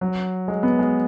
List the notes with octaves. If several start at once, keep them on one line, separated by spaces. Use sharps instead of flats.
F#3
G#3
B3
G#3